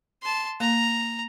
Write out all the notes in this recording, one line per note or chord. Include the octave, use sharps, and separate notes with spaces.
A5 C6
A#3 A#5